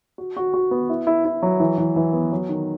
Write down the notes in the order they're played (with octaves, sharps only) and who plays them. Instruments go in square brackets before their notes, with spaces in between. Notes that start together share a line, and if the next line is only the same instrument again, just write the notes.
[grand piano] F#4
F#4
F#4
B3
E4
E4
E4
F#3
E3
E3
E3
B3
F#3
D#3